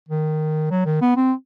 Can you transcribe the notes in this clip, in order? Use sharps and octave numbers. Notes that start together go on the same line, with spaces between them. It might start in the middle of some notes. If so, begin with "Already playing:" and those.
D#3
F#3
D#3
B3
C4